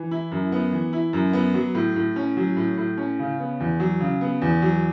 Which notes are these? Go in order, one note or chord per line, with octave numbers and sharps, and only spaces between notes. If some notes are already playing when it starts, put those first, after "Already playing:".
Already playing: E3
E4
F#2
B3
E3
E4
F#2
B3
F#3
A2
A2
C#4
F#3
A2
A2
C#4
C#3
B3
E2
F#3
C#3
B3
E2
F#3